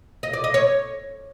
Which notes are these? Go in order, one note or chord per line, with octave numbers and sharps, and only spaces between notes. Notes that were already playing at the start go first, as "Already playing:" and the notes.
D#5
D5
D#5
C#5